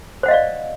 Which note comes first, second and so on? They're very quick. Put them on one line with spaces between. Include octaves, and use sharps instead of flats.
C5 F#5 D#5 F5 D5